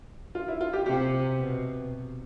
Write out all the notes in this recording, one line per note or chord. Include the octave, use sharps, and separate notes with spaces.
F4
E4
F4
G4
C3 G4
B2